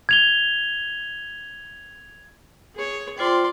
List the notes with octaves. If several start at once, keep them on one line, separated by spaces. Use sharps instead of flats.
G#6 F7 G7
G#4 C#5
F4 C5 D5 G5 C6